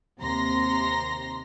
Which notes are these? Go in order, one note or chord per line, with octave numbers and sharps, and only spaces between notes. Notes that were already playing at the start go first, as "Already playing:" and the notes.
D#2 C3 A#5 C6 A#6